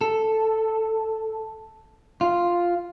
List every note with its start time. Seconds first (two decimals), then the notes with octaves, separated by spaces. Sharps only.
0.01 A4
2.21 F4